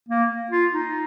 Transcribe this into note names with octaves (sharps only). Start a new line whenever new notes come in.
A#3
F4
D#4